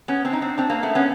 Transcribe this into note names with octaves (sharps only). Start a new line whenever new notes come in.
B3 C#4
C4 D4
D#4
C4 D4
C4 D4
A#3 C4
A3 B3
B3 C#4